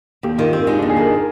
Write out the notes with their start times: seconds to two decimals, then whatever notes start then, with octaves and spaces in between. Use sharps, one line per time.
0.23 D#2 G4
0.38 D#3 F4
0.53 C4 G4
0.67 G#3 D#4
0.79 D4
0.82 D#2
0.89 G#4
0.97 D#3 A#4